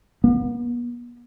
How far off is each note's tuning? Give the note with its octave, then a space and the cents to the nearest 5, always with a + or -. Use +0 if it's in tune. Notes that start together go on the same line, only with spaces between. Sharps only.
B3 -40